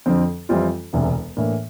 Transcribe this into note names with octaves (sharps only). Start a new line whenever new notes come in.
F2 D3 F3 C4
F2 E3 G3 C4 F4
E1 D2 C3 E3
A2 E3 A#3 D4